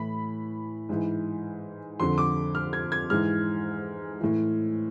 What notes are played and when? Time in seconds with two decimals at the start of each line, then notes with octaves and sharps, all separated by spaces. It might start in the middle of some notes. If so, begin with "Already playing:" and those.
Already playing: A2 E3 B5
0.89 G#2 E3
2.00 F2 D3 C6
2.18 D6
2.55 F6
2.73 G#6
2.92 G#6
3.10 G#2 E3 F6
4.21 A2 E3